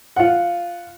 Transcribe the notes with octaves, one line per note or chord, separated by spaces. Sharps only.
F4 F#5